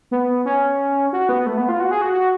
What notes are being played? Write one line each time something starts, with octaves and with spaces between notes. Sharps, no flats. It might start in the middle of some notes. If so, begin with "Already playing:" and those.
B3
C#4
F#4
B3
A3
B3
F4
F#4
G#4
F#4
F#4